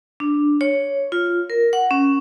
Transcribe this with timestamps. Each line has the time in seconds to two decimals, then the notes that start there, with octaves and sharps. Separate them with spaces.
0.20 D4
0.61 C#5
1.12 F4
1.50 A#4
1.73 F#5
1.91 C#4